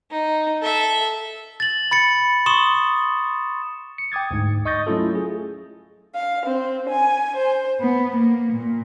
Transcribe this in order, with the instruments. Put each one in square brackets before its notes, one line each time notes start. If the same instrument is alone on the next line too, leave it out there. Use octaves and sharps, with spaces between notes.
[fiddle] D#4
A4 E5
[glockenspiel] A6 F#7
B5 A6 C#7
C6 C#6 D#6 E7
[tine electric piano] C#7
G5 D6 D#6 G#6 A6
D2 G#2
D#5 C#6 D#6 G6 A6 A#6
F#3 A3 C#4 E4 F4 A4
G#4
[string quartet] F5
C4
G#5
C5
B3
A#3
A#2